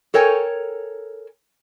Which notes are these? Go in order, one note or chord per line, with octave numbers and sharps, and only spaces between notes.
A4 A#4 C#5 G5 G#5